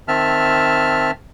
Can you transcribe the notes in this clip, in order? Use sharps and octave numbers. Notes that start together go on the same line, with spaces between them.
D#3 C4 E5 A5 F6